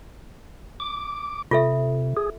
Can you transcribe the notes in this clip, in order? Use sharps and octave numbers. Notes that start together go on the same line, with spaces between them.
D6
C3 F4 A4 E5
G#4